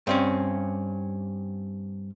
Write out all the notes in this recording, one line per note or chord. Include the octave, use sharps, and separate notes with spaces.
G2 C4 C#4